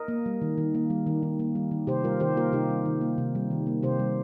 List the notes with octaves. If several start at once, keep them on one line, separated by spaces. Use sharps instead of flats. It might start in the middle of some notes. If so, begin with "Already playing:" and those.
Already playing: A#4 D#5
A#3
G3
D#3
D#3
A#3
G3
D#3
D#3
A#3
G3
D#3
C3 G4 C5
G3 F4 A#4
D#3 G4 C5
A#3 F4 A#4
C3 D#4 G4
G3
D#3
A#3
C3
G3
D#3
A#3
C3 G4 C5
G3